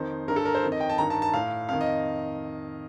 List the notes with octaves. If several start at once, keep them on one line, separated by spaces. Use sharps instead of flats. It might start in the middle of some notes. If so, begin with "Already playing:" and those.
Already playing: F2 D#3 C5
G2 D3 A#4
A4
A#4
C5
F2 D#3
D#5
G5
A5
G2 D#3 A#5
A5
A5
A2 F5
F2 D#3 F5
D#5